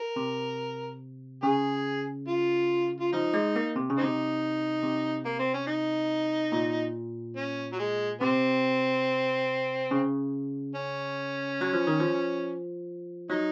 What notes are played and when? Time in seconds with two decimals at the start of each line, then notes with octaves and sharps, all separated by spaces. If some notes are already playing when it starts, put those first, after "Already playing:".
Already playing: A#4
0.16 C3
1.43 C#3 G#4
2.28 F4
3.01 F4
3.13 F3 D#4
3.34 G#3
3.56 A#3
3.76 C3
3.90 C#3
3.98 G#3 C4 D#4
4.03 C3
4.83 C3
5.26 A#3
5.40 C4
5.54 C#4
5.67 D#4
6.52 A#2
7.37 C#4
7.72 F#3
7.79 G#3
8.21 C3 C4
9.91 C#3
10.75 C#4
11.61 F#3
11.73 F3
11.87 D#3
12.00 F3
13.30 F#3 D#4